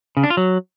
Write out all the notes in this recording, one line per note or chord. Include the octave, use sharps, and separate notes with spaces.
C#3
D4
F4
F#3